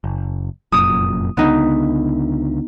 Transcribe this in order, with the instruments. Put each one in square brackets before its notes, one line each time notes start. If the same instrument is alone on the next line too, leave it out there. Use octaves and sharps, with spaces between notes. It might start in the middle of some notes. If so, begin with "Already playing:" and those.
[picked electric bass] F#1
[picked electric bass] F1 F#2 A#2 [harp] D#6
[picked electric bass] C#2 D3 [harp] B3 D#4